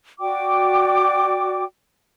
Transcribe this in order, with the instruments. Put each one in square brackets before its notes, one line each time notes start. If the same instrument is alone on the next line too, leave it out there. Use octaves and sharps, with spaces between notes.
[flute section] F#4 D5 G5 D6